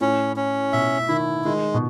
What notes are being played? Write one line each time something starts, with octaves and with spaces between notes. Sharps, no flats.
A2 C#4
C#4
B2 E5
D#3 E4
D#3 G#3
B2